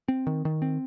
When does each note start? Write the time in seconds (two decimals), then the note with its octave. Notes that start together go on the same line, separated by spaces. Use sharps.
0.08 C4
0.27 D#3
0.45 D#3
0.62 C4